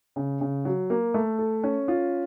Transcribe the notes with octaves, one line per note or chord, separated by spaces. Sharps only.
C#3
C#3
F#3
A#3
A3
A4
C#4
F4